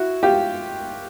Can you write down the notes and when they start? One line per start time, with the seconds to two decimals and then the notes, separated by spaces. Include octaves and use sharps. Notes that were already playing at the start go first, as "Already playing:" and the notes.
Already playing: E4 F#4
0.23 F4 G4